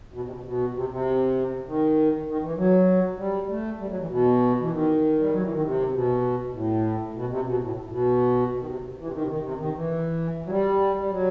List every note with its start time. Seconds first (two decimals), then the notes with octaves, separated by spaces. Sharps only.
0.14 B2
0.24 C3
0.33 B2
0.44 B2
0.74 C3
0.90 C3
1.66 D#3
2.27 D#3
2.42 E3
2.57 F#3
3.18 G3
3.49 A3
3.79 G3
3.89 F#3
3.99 E3
4.10 B2
4.60 E3
4.70 D#3
5.20 G3
5.30 F#3
5.41 E3
5.52 D#3
5.62 C3
5.93 B2
6.53 A2
7.14 B2
7.29 C3
7.45 B2
7.60 A2
7.86 A2
7.90 B2
8.59 D#3
8.66 C3
8.97 E3
9.05 C3
9.12 D#3
9.21 C3
9.28 D#3
9.43 C3
9.58 D#3
9.74 E3
10.46 F#3
10.49 G3
11.00 G3
11.10 F#3